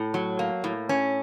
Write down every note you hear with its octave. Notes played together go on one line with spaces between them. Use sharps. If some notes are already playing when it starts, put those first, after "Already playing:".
Already playing: A2
F#3
A#3
A2
C#4